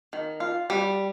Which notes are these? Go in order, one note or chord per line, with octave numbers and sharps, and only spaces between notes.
D#3
F4
G3